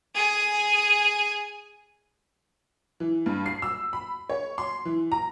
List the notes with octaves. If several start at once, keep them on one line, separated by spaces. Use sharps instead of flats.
G#4 G#5
E3
G2
C7
E6
B5
C#5
C6
E3
A#5